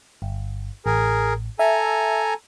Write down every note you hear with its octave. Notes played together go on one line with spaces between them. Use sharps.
G1
A1 G#4 A#4
A4 E5 G#5 A#5